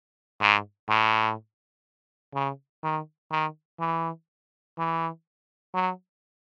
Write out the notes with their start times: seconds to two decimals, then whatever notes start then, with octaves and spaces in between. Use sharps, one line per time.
0.41 G#2
0.89 A2
2.34 C#3
2.83 D#3
3.31 D#3
3.80 E3
4.78 E3
5.74 F#3